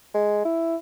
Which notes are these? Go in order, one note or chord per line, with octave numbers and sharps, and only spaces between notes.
G#3
E4